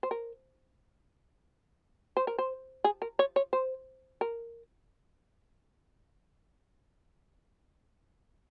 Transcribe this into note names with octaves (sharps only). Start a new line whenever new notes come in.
C5
A#4
C5
A#4
C5
G#4
A#4
C#5
C#5
C5
A#4